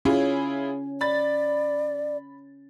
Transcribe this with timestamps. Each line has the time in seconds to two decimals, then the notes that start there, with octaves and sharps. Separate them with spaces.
0.05 C#4 E4 F4 G#4
1.01 D5 B5 A6